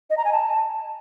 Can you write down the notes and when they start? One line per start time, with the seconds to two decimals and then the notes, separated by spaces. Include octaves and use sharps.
0.10 D#5
0.17 A#5
0.25 G#5
0.32 A5